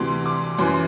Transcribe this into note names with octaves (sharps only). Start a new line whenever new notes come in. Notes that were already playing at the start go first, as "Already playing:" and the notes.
Already playing: D2 C3 E3 C6
D6
F#2 E3 C6